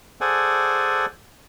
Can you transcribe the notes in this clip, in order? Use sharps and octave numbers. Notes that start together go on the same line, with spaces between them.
G#4 A4 C5 D5 F#5 G#5